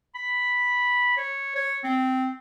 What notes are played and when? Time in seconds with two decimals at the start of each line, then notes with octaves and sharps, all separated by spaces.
0.15 B5
1.18 C#5
1.56 C#5
1.84 C4